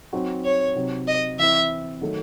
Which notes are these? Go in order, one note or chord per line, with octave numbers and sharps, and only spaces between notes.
F#3 C4 D#4 F#4
C#5
C3 F#3 C4 D#4
D#5
E3 C4 E4 E5
D#3 F#3 A3